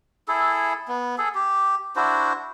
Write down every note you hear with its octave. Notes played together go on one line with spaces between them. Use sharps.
E4 G#4 A4
B3
G#4 A4
G4
D4 E4 F#4 C5